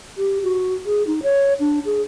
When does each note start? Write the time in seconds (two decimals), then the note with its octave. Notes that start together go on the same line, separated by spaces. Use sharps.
0.18 G4
0.43 F#4
0.86 G#4
1.07 D#4
1.23 C#5
1.60 D4
1.85 G#4